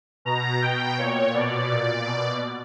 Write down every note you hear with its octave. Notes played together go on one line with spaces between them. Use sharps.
B2 A#5
B2 G5
A#2 C#5
B2 D5
A#2
B2